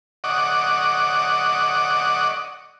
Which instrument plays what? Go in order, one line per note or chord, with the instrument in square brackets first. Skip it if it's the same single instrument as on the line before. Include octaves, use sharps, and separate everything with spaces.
[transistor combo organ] D5 D#5 F#5 C#6 D6